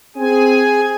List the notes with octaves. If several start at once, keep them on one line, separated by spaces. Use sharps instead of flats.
C4 G#4 G#5